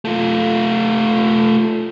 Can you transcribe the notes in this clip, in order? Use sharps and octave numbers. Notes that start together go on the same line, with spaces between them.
A3 F4